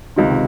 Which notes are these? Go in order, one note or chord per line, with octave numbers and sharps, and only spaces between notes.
C#2 C3 D#3